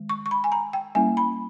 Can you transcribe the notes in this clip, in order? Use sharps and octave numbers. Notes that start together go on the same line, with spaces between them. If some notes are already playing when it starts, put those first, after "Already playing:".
Already playing: D#3 G#3
C#6
C#6
B5
G#5
A#5
G5
G3 A#3 C#4 E4 G#5
B5